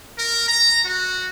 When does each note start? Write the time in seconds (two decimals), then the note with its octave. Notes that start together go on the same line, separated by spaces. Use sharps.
0.19 A#4
0.48 A#5
0.84 F#4